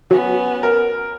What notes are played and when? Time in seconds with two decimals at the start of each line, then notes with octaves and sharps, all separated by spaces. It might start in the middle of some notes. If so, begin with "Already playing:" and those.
0.11 F#3 B3 C#4
0.63 A#4